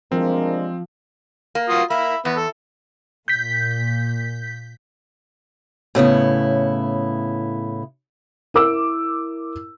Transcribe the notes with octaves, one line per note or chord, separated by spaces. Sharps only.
C3 F3 G#3 C4 D4 A#4
A#3
F4 F#4 D#6
A#3 E5 B5
E2 B3
A4
A#2 G6 B6
A2 C#3 B3 E4
E4 A#4 D6 E6